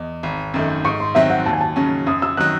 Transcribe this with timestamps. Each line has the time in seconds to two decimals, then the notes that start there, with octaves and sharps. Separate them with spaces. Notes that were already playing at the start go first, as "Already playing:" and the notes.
Already playing: E2 D#5
0.23 G#1
0.54 F#2 D#3 A3
0.85 G#2 C#6
1.00 C6
1.15 D#3 F#3 C4 E5
1.30 F#5
1.46 D#2 A5
1.53 G#5
1.61 A5
1.76 C#3 F#3 C#4
2.07 F#2 D#6
2.22 E6
2.37 D#3 F#3 F#6